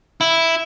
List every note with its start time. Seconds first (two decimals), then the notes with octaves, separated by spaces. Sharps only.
0.21 E4